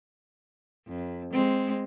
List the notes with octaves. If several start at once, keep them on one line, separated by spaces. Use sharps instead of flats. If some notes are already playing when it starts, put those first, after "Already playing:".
F2
G#3 C4